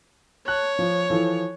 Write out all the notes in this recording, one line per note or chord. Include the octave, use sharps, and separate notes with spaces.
C#5 A5 F#6
F3
E3 F3 A4